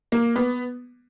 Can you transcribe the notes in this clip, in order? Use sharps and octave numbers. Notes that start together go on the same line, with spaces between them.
A#3
B3